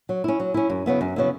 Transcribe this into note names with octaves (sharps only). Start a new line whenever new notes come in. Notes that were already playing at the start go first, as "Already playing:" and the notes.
F#3
C#4 E4
F#3
C#4 E4
F#2
C#3 F#3 B3 E4
F#2
C#3 F#3 B3 E4